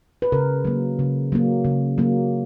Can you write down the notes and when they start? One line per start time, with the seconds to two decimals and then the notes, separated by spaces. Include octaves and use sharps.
0.22 B4
0.32 C#3 A#4
0.65 F#3 A#3
0.99 C#3
1.32 F#3 A#3
1.64 C#3
1.98 F#3 A#3